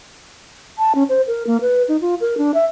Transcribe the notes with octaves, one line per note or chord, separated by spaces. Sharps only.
A5
C#4
C5
A#4
A#3
B4
D#4
F4
A#4
D4
E5